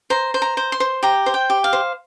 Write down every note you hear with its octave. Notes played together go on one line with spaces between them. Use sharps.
C5 A#5
C5
A#5
C5
C6
C5
G4 A#5
C5
G5
G4
F5
C5